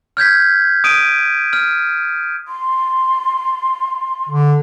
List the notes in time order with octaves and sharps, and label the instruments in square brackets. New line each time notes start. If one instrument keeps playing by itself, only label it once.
[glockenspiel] F6 G6 G#6 B6
D#6 D7 D#7
F6
[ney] C6
[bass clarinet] D3